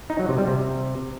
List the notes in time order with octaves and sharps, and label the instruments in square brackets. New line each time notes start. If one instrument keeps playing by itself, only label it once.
[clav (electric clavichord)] D#4
F#3
C3
G3
C3